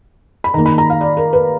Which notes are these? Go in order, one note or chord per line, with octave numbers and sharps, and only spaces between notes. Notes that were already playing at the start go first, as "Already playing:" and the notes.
B5
D#3 A#3 A#5
B5
A#5
F5
D5
A#4
B4